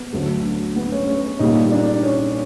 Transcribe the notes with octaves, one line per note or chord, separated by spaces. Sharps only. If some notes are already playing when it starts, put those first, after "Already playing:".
Already playing: B3
D2 D3 F#3 A3
B3
C#4
C#4
A#2 G3 A#3 D#4
D4
C#4